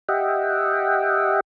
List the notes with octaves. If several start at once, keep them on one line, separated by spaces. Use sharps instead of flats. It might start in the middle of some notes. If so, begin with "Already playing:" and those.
G4 D#5 E5 F#5 G5